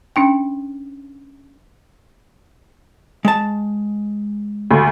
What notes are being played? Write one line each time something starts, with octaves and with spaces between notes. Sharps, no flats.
C#4 D4 G5
G#3 A5
D2